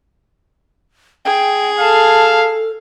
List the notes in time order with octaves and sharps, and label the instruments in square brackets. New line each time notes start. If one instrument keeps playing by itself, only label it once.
[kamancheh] G#4 [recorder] G5
[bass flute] A4 [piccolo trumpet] F5 [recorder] A5